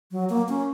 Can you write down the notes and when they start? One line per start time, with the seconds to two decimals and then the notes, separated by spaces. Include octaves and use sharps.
0.11 F#3
0.30 A#3
0.49 C#4